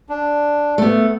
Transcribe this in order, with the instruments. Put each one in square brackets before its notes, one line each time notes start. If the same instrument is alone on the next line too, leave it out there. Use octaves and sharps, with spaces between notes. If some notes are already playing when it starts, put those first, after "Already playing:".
[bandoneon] D4
[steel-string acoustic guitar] A3 B3